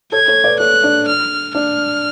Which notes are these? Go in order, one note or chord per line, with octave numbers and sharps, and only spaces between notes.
A4 C#5 G#6
A4 C#5
B4 D5
A4 C#5 F#6
D4
F6
D4 F6